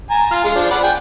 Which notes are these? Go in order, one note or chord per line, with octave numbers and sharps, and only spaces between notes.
G#5 A#5
F4 F6
G#3 F5
F3 D4
D5 F#5 B5
G5 G#5